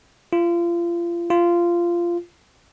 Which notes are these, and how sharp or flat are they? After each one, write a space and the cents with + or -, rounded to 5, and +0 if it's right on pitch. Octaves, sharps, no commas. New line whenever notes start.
F4 -30
F4 -15